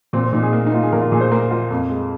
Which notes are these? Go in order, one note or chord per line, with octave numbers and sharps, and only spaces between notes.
A#2 C4
C4
A#2 D#4
G#4
A#3
D#4
A#3 F4
G#4
A#2 A#4
F4
A#2 G#4
C5
A#3 A#4
A#3 F4
F2
G#3